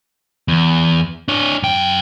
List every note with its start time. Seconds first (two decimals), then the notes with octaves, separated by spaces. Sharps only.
0.48 E2
1.28 D4 C#5
1.63 F#2 G5